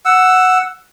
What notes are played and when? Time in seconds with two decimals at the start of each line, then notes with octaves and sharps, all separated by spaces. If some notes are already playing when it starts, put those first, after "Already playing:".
0.05 F#5 E6